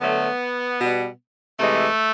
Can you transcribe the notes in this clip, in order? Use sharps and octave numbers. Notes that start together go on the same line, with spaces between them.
D3 F#3 A3 B3
B2 G3
C3 E3 G#3 A3